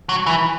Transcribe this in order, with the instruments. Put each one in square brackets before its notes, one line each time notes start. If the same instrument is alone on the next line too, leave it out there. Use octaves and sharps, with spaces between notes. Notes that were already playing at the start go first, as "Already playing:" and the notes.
[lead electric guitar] F#3
E3